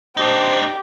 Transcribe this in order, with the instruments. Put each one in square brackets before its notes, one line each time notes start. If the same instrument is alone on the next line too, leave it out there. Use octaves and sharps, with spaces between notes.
[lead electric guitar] D4 D#4 [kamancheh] G4 [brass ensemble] C5